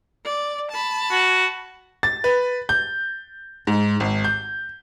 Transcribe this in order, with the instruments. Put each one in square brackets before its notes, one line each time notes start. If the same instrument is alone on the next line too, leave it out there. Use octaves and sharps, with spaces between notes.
[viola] D5
A5 B5
[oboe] F#4
[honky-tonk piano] A6
B4
G6
G#2
G#1
G6